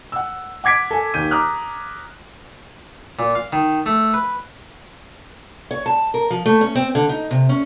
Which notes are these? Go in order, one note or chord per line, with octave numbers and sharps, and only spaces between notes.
F#5 E6
F#5 D6 G#6 B6 D7
A4 G#5
D#2 D#3 G6 D#7
A#5 D6 D#6 F6 F#6
A#2
F5
D#3
A3
B4
C#5
A5
A#4
F3
A3
C#4
C4
D3
D#4
C3
C#4